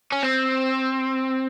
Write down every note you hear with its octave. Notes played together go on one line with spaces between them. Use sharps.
C#4
C4